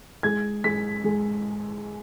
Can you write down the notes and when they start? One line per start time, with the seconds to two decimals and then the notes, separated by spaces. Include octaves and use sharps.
0.23 G#3 G#6
0.64 G#3 B6
1.04 G#3